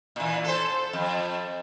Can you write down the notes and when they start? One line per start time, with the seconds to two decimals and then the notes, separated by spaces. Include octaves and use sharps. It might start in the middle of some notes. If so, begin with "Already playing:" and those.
0.16 A#2 E3
0.44 A4 C5
0.93 F2